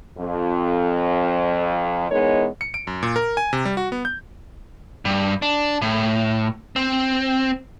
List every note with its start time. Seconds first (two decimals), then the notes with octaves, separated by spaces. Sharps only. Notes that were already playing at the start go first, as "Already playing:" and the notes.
0.18 F2
2.11 E3 G#3 B3 D#4 A#4 C#5
2.61 C#7
2.74 D7
2.87 F#2
3.03 A#2
3.16 A#4
3.37 G#5
3.53 C3
3.65 G3
3.77 F#4
3.92 B3
4.05 G6
5.05 G2
5.42 D4
5.82 A2
6.76 C4